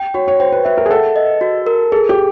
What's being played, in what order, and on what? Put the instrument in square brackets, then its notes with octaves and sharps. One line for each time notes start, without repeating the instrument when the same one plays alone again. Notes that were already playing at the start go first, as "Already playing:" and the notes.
Already playing: [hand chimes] G5
[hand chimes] F#4 [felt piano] C#5
[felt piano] C#5
[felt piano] C5 [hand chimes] G5
[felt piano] B4
[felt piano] B4 [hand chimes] E5
[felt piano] A#4
G#4
[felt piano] A4 [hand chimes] F#5
[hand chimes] D#5
F#4
A#4
[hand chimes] G#4 [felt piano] A4
[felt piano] G4